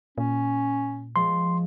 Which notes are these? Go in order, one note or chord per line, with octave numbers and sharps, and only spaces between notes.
A#2 C#4
F3 G#3 C6